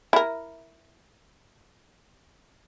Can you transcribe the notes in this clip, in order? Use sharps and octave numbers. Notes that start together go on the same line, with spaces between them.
E4 A#4